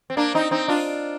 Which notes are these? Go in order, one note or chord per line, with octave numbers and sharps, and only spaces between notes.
C4
A#3 D4
C4 D#4
C4 D#4
D4 F4